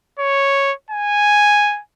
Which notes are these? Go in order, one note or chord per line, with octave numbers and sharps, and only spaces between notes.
C#5
G#5